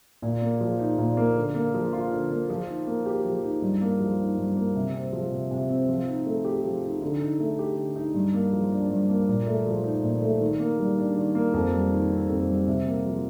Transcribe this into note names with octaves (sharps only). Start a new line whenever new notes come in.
A#2
A#3
F3
D#4
A#2
A#3
D3
A#3
F3
F4
D3
A#3
F3
D#4
A#3
G4
F3
D#4
G2
A#3
F3
D#4
G2
A#3
C3
C4
F3
C3
C3
C4
F3
D#4
A3
G4
F3
D#4
D3
D#4
A3
G4
D3
D#4
G2
A#3
F3
D4
G2
A#3
A#2
A3
F3
D#4
A#2
A3
D#3
A#3
G3
D4
D#3
A#3
F2
G3
D#3
C4
F2
G3
C3
A#3
F3